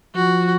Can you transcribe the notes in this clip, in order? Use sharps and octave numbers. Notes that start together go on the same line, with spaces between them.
F3 F#4